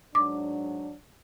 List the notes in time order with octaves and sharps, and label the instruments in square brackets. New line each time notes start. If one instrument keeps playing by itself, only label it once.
[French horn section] G#2 F#3 D4 [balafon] D6